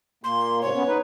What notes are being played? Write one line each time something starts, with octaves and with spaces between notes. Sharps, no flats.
A#2 A#3 C6
G#2 C3 C#5
F#2 B3 C#4
D#4 B4